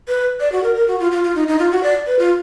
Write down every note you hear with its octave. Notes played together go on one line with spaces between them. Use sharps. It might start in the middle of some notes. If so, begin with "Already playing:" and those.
B4
D5
F#4
A#4
A#4
F#4
F4
F4
F4
D#4
D#4
F4
F#4
D5
B4
F4